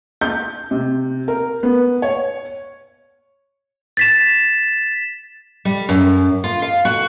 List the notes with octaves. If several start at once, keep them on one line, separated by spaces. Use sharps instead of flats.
G6
C3
A#4
B3
C#5
A6 B6 E7
G3
F#2
F4
F5
F#4